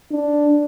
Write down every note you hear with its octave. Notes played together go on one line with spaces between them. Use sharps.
D4